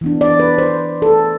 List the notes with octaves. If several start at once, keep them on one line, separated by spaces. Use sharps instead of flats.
E3 B3 D4
D5
B4
C5
A4